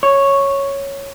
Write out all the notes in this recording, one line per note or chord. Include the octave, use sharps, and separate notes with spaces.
C#5